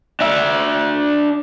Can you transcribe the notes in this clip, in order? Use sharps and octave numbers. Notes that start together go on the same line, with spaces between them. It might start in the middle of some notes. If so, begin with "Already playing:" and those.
D4 E5